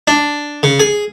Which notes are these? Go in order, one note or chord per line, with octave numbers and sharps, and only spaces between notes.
D4
C#3
G#4